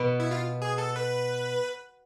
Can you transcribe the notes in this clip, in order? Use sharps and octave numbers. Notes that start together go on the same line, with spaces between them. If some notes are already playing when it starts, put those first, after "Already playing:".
Already playing: B2 B3
E4
F4
G#4
A4
B4